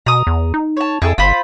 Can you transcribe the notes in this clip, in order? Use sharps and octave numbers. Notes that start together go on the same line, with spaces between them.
B2 A#5 D#6
E2
D#4
C#5 A5
F2 E4 G#4 A4
G1 F4 C5 B5